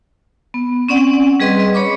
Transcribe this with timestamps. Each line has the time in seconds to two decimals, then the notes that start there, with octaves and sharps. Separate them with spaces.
0.54 B3
0.89 C4 C#4 D5 F#5
1.40 G3 G#4 B4 D#5 C6
1.60 D#5
1.74 C#5 B5 C#6 D6